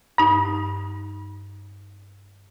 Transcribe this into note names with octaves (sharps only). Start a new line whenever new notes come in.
G2 D#4